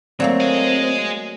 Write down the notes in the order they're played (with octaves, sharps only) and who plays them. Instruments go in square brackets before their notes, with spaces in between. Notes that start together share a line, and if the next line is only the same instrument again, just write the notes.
[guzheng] F#3 A3 A#3 [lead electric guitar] C4 [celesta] D5 F5
[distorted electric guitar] G#4 D#5